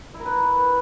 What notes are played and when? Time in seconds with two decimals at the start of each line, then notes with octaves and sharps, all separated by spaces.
0.14 E4
0.20 A#4
0.25 B4